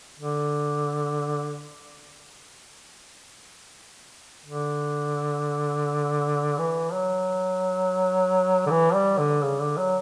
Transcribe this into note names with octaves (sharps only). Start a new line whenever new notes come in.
D3
D3
E3
F#3
D3
E3
G3
D3
C#3
D3
F#3